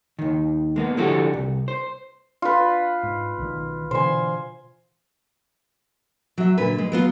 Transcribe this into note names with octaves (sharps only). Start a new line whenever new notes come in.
D#2 D#3
G#3 A#3 B3
D3 F3 E4 F#4 G4 A4
C2
C5
F4 B4
G#2
B1 D#3
B2 D3 E3 C5 G#5
F#3 E5
A#2 D3 B4
G#3
F#3 B3 F4